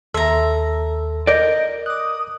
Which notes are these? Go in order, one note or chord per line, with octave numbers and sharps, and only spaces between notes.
D#2 A4 E5 A#5 C6
A#4 D5 D#5 G6
D6 D#6 F#6